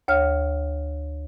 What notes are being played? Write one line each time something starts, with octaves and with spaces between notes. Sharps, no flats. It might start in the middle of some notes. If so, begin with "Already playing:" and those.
D2 C#5 F5 F6